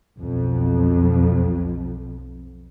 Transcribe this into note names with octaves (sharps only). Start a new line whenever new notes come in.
B1 F2